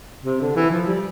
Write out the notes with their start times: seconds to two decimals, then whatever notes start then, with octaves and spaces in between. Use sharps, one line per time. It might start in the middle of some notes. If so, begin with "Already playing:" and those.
0.25 C3
0.41 D3
0.56 E3
0.70 F3
0.87 G3